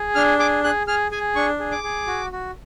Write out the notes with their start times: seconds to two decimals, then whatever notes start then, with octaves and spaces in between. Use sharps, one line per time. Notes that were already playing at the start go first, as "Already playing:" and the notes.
Already playing: G#4
0.15 D4 F6
0.39 G#4 D6
0.64 G#4 F#6
0.87 G#4 F6
1.11 G#4 G#5
1.35 D4 C#6
1.60 G#4
1.72 D6
1.83 G#4
2.07 F#4
2.32 F#4